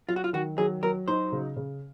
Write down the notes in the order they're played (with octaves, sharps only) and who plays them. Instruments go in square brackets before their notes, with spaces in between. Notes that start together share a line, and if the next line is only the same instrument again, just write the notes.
[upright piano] F#3 [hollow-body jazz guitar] F4
[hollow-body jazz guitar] F#4
F4
[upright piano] D#3 [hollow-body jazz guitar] F#4
[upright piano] F#3 [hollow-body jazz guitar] G#4
[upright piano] F#3 [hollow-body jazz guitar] A#4
[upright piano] D#4 [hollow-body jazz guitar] C5
[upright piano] C#3
C#3